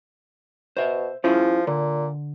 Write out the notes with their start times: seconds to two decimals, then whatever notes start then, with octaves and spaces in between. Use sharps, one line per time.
0.77 B2 C5 E5
1.24 F3 C#4 E4 G#4
1.67 A#2 D3